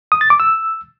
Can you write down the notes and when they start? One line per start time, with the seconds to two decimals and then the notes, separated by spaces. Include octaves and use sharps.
0.12 D#6
0.21 A6
0.30 D6
0.40 E6